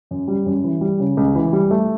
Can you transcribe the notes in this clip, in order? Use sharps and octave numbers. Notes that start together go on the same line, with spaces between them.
F#2
G3
F#2
E3
G3
C#3
C#2
E3
G3
A3